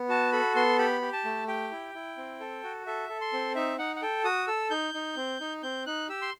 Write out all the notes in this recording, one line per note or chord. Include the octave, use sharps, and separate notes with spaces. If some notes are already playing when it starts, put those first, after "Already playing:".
Already playing: B3
F#4 A5
A4 B5
B3 C6
G4 B5
G4
A5
A3
G4 G5
E4
E4
C4
A4
F#4
A4 E5
A4
C6
C4
D#4 E5
D#4 F#5
F#5
A4 G5
F#4 D#6
A4 E6
D#4 G6
D#4
C4
D#4
C4 G6
D#4 F#6
G4 E6
C6